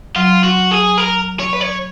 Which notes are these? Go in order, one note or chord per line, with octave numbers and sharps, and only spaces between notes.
F#3 F4
F#4
G#4
A#4
C#5
B4
C#5